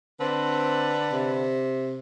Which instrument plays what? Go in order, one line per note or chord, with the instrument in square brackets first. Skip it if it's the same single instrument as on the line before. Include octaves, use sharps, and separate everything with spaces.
[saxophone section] D3 D4 B4 [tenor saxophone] C4
[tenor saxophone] C3